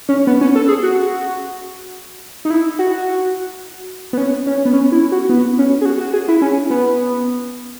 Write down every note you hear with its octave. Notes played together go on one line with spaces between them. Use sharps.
C#4
B3
C#4
A4
G#4
F#4
D#4
E4
F#4
B3
C#4
C#4
B3
C#4
E4
F#4
B3
C#4
G#4
F#4
F#4
G#4
E4
C#4
B3